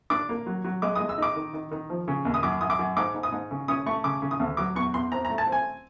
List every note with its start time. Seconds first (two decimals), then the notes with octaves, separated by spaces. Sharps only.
0.10 D4 D6
0.29 A#3
0.46 F#3
0.64 F#3
0.82 G#3 D6
0.96 D#6
1.00 G#3
1.09 E6
1.18 D#4 D6
1.36 D#3
1.54 D#3
1.71 D#3
1.90 F3
2.08 C#3
2.25 D#2
2.34 D#6
2.43 F#2 D6
2.61 F#2 D#6
2.70 D6
2.79 F#2
2.97 G#2 D6
3.14 G#2
3.23 D#6
3.32 G#2
3.51 C#3
3.68 C#4 D#6
3.86 A3 C#6
4.04 C#3 D6
4.22 C#3
4.31 D#6
4.40 D2
4.57 F#3 D6
4.75 E2 C#6
4.94 E2 C6
5.12 C4 A#5
5.25 A#5
5.30 A3
5.38 A5
5.47 C4
5.52 G#5